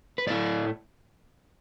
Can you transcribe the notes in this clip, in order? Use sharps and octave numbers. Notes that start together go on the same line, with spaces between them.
B4
A2 A3 E4 D5